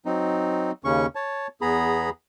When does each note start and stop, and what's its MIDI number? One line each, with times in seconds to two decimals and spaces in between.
0.06 0.71 54
0.06 0.71 60
0.06 0.71 63
0.84 1.06 39
0.84 1.06 49
0.84 1.06 61
0.84 1.06 85
1.15 1.47 73
1.15 1.47 81
1.61 2.10 40
1.61 2.10 59
1.61 2.10 68
1.61 2.10 82
1.61 2.10 83